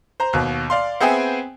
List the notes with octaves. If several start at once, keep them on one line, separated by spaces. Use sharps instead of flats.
C5 A#5
D#2 B2
D5 F5 C6
B3 C4 G#4 E5 G5 G#5